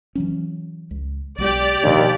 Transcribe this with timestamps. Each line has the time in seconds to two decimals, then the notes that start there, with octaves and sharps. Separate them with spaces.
0.15 E3 F#3 C#4
0.91 C#2
1.38 B1 G#3 G4 D5
1.83 D#2 B2 F3 D4